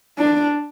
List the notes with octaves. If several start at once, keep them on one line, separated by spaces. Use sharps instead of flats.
D4